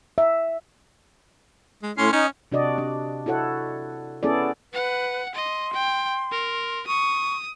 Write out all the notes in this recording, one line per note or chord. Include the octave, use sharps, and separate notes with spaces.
E5
G#3
A2 C#4 C6
C#4 D#4
C3 D4 F#4 D5 D#5
D4
E4 F#4 A4 C#5 F#5
B3 C#4 E4 G#4 A4 D5
B4 F#5
D#5 C6
G5
A#4
C#6 D#6